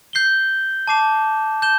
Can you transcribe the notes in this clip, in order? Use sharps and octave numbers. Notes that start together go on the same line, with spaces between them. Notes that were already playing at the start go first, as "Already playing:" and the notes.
G6 C7 G7
A5 D6 C7 E7
G6 E7 G7